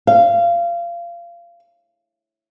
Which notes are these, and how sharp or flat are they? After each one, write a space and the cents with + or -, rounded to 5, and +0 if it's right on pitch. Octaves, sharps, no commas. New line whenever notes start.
F5 -25